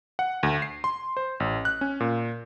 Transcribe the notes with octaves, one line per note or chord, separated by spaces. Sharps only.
F#5
D2
C7
C6
C5
A1
F#6
C#4
A#2